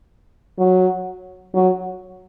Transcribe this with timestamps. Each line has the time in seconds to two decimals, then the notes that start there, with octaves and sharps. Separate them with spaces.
0.59 F#3
1.54 F#3